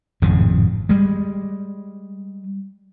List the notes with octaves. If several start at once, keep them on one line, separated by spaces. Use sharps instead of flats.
G#1 F2 A2 C#3
G3 G#3